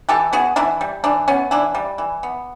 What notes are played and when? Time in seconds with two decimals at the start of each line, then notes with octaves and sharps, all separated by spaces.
0.09 E3 G4 A4
0.33 B3 F#4 G#4
0.56 E3 D4 E4
0.81 G3
1.04 E3 D4
1.28 B3 C#4
1.51 E3 D4 E4
1.75 G3
1.98 E3
2.23 B3